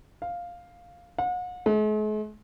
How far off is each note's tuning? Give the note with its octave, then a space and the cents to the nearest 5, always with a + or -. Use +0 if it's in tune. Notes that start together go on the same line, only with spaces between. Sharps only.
F5 +5
F#5 -40
G#3 +45